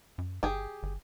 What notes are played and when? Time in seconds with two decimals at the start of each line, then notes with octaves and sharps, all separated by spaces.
0.18 F#2
0.43 G1 G4 G#4
0.83 G1